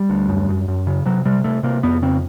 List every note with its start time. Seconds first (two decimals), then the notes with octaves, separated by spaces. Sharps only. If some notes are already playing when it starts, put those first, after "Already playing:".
Already playing: G3
0.10 D2
0.29 F#2
0.49 F#2
0.68 F#2
0.87 C#3
1.06 C3 F#3
1.25 C3 G3
1.44 C3 A3
1.63 C3 A#3
1.83 F2 B3
2.02 C#3 C4